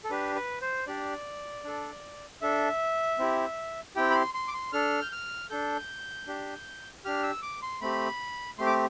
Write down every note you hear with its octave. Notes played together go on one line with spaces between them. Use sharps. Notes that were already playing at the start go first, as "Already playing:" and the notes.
A4
D4 G4 B4
B4
C5
D4 G4 D5
D4 A4
D4 A4 E5
C4 E4 G4
C4 E4 G4 G5
B5
C6
C6
D6
C6
D4 A4 F6
G6
F6
D4 A4 G6
D4 G4
D4 G4 F6
E6
D6
C6
A3 C4 G4 B5
A3 C4 G4 C6
D6